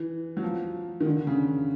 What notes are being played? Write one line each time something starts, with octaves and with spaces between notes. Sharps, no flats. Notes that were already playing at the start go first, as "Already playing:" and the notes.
Already playing: E3
F#3
F3
D#3
D3
D3
C#3